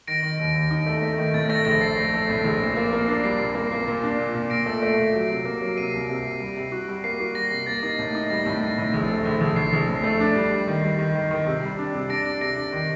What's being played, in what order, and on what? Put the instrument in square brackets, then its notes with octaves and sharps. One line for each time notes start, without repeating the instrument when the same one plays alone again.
[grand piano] D#3 [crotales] A#6 D7
[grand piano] D#3
D#2
D#2
D#4
A3
A3
D#3
[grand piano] A2 [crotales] A6
[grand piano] A3 [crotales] A#6
[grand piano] A#1 [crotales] A#6
[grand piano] A3 [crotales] C7
[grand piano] A3
A3
A2
A#1
A#2
A#3
A#3
D4
[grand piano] G3 [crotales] C7
[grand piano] A#2
A#3
A#3
A#2
D4
A#2
A#2
[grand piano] A#2 [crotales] A#6 D7
[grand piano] A3
A3
A#2
F#3
C3
A#3
F#3
[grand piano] C3 [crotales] C7 D#7
[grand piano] C2
C3
C3
G3
C3
F#4
G3
[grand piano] A#3 [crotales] C7
[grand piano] F#4
[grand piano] G3 [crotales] A#6
[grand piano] C3
[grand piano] A#3 [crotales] A6
[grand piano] D#4
A2
D#4
[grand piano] G3 [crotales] A#6
[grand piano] A2
D#4
A2
A#1
A3
A#1
A#1
[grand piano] A#1 [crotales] C7
[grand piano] A#1
A2
A3
D4
G3
G3
D#3
G3
D#3
D#3
D#3
C3
G3
D4
C3
[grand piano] D4 [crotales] A#6 D7
[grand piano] D4
[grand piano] C3 [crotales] A#6 D7
[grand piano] D4
D#3